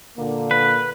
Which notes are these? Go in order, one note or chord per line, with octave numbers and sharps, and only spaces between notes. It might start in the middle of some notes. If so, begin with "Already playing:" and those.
A#2 D3 A#3
B4